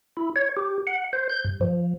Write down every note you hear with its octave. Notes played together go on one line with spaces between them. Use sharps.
E4
C#5
G4
F#5
C5
G6
G2
F3